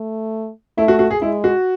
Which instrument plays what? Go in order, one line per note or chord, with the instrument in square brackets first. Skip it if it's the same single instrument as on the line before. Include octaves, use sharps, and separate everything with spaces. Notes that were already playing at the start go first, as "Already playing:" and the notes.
Already playing: [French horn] A3
[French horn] A3 [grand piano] E4
[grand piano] F#4
F#4
G#4
[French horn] G#3 [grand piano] E4
[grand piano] F#4